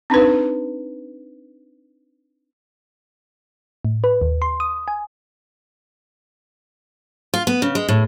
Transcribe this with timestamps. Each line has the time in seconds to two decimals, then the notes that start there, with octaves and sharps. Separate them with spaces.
0.10 C4 D4 D#4 B4
3.85 A2
4.04 B4
4.22 D#2
4.42 C6
4.60 D#6
4.88 G#5
7.34 F4
7.47 B3
7.62 C#3
7.75 G#3
7.88 A2